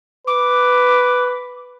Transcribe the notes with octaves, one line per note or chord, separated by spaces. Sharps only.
B4 D6